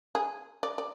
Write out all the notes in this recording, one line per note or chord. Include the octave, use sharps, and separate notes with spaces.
G#4
D5
D5